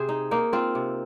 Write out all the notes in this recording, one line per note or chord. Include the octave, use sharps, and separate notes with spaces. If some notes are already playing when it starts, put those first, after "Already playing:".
Already playing: C3 G#4 C5
D#4
A#3 D#4
C4 F4
C3